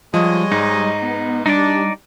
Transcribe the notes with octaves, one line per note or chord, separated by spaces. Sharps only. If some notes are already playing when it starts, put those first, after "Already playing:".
F3 G3 G#3 C#5 D#5
G#2 D#4
B3
G3 D4 D#4 D5